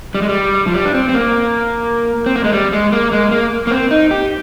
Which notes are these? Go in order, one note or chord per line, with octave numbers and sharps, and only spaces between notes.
G3
G#3
G3
F3
G3
D4
C4
C4
A#3
C4
A#3
G#3
G3
G#3
A#3
G#3
A#3
A#3
C4
D#4
G4